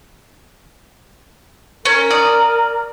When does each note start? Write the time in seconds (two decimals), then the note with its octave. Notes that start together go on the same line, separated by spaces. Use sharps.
1.85 C#4 A#4
2.10 D5 D#6